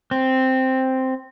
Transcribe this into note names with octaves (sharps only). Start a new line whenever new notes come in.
C4